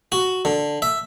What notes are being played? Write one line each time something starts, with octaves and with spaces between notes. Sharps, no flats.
F#4
D3
E5